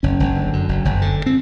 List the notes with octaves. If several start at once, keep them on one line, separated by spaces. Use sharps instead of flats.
F#1 C#4
F#1
D3
F#2
F#1
F#1
D3
C4